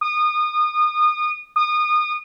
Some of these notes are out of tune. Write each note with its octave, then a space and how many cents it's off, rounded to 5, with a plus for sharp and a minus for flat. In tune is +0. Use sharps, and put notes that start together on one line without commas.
D#6 -30
D#6 -30